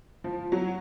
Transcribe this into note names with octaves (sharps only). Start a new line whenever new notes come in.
F3
F#3